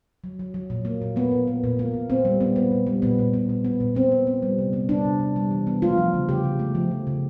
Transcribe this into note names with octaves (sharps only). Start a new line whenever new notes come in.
F#3
F#3
F#3
A#2
A#3
A#2
A#3 B3
A#2
A#3
A#2
A#3
A#2
A#2 C4
G3
B3
B3
A#2
G3
A#2 B3
A#2
B3
A#2
B3
A#2
B3 C4
B3
B3
G3
C3
B3
G3 D4
C3
C3
G3
E3
B3
A3 F4
F3
C#3
C#3 G4
C#3
A3
F3
F3
C#3